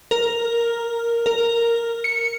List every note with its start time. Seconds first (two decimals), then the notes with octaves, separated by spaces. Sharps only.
0.11 A#4
1.26 A#4
2.04 C#7